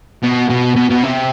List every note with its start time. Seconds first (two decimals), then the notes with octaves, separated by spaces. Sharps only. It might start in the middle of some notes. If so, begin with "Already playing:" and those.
0.23 B2
0.50 B2
0.76 B2
0.90 B2
1.03 C3